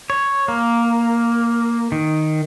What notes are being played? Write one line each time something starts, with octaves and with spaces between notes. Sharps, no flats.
C#5
A#3
D#3